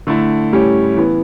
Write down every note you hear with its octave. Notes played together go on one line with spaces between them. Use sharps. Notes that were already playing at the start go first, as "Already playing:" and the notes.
D3 A3 E4
A2 G3 C#4 E4 G4
E3 B3 E4